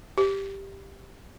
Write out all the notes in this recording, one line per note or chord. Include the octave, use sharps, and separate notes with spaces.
G4